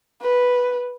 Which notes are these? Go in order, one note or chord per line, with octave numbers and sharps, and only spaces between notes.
B4